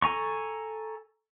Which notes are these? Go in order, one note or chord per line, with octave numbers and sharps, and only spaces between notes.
A4 G#5 A#5 C#6